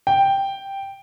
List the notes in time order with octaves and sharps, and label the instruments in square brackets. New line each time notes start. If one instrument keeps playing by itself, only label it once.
[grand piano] G5